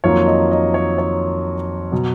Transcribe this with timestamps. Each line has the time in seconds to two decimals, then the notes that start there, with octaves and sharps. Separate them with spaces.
0.04 F2 D#3 F#3 A#3 F4 C#5
0.27 D#5
0.51 D#5
0.74 C#5
0.98 C#5
1.92 B2 F#3